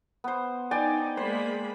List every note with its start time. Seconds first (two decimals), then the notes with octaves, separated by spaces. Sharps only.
0.24 B3 C5
0.71 D#4 D5 G5 G#5
1.17 G#3 A#3 C5 B5